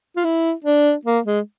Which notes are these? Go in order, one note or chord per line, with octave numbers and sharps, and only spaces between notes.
F4
E4
D4
A#3
G#3